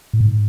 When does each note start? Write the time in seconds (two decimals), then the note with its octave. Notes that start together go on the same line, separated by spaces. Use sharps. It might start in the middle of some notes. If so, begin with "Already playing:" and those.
0.13 A2
0.20 G#2